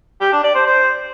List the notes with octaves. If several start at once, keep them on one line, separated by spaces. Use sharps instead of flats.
G4
D4
D5
C5
C5